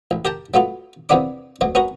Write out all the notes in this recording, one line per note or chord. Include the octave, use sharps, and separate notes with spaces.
A1
G4 A#4 G5 A5
F#3 A3 B3 F4
E2 C3 A#3 B3 D4 D6
D2 B2 F#3
B3 C#4 F#4 A#4